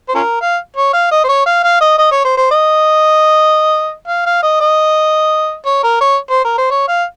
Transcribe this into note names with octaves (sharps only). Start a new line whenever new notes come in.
C5
C#4 F4 A#4
F5
C#5
F5
D#5
C5
C#5
F5
F5
D#5
D#5
C#5
C5
C5
D#5
F5
F5
D#5
D#5
C#5
A#4
C#5
C5
A#4
C5
C#5
F5